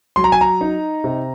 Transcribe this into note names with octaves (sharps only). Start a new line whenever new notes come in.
F#3 C6
A#5
G#5
A#5
D#4
C3